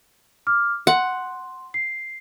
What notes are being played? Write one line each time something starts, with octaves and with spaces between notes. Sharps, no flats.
D6 F6
F#5 C6
C7